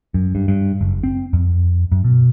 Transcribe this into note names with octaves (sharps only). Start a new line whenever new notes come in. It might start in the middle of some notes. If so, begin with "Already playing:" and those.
F#2
G2
G2
F#1
C4
F2
F#2
B2